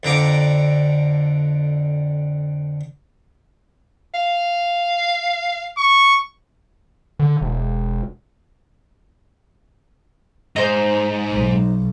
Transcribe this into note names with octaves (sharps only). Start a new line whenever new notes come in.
F2 D3 A#5 D6
F5
C#6
D3
E1
G#2 D#4 C5
B1